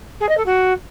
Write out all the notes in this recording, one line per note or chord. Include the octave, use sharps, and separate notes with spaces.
G#4
D#5
A4
F#4